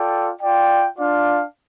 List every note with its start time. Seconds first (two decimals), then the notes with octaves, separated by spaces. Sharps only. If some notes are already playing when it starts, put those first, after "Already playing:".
Already playing: F4 A4 D5 G5
0.41 F4 D5 G5
0.98 D4 F4 D5 F5